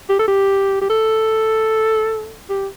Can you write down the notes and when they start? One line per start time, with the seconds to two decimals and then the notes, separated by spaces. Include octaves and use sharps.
0.10 G4
0.19 A4
0.28 G4
0.82 G4
0.90 A4
2.49 G4